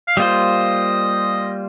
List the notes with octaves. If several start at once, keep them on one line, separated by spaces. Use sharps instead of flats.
F5
G3 A#3 F4 C5 D#5